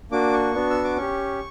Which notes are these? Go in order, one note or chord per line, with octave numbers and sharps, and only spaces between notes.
A#3 D4 F#4 D6
C#6
B3 D4 F#4
E6
D6
C#4 G4 C#6